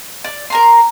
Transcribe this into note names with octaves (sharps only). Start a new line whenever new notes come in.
D5
A#4 A#5 C6